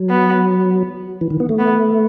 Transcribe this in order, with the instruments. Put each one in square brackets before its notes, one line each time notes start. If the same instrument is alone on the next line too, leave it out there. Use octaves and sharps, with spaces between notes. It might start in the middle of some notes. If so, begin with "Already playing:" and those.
Already playing: [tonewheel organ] F#3
[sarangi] B3
[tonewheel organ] E3
D#3
B3
A3
[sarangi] B3